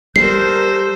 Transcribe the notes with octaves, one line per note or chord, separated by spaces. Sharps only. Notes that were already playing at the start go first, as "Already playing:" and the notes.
G3 A4 A#4 C5 G6 C7